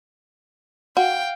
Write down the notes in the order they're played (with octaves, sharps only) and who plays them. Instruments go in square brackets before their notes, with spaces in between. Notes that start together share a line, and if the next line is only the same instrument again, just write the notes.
[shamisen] F#4 [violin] F5 G5